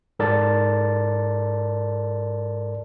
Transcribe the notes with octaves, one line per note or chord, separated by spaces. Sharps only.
G#2 A4 A#4 D5 A5 A6